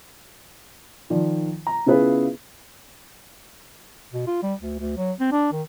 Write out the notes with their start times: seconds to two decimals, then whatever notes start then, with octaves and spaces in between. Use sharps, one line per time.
1.10 D#3 F3 D5
1.67 A#5
1.86 C#3 B3 E4 F4 G#4 B4
4.13 B2
4.27 F4
4.43 G3
4.60 D2
4.79 D2
4.98 F#3
5.20 C4
5.32 D4
5.53 D#3